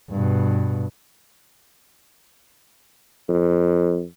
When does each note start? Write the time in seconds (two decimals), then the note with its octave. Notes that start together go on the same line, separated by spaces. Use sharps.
0.10 G2 B2
3.29 F2